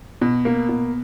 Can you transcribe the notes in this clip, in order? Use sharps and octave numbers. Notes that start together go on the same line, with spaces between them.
B2
A#3
B2